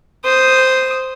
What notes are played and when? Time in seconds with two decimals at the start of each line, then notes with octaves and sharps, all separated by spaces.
0.25 C5 D#6